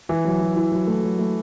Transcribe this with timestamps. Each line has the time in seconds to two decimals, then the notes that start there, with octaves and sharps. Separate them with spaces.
0.09 E3 E4
0.25 F#3
0.41 F#3
0.56 E4
0.72 F#3
0.87 A3
1.03 F#3
1.19 A3